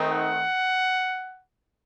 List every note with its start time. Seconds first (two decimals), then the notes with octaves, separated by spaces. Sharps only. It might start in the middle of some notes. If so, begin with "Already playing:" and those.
Already playing: D#3 A3 C4 D#4
0.10 F#5